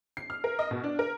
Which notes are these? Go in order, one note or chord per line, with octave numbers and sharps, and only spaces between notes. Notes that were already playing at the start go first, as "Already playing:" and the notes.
C7
F6
A#4
D#5
B2
D4
A#4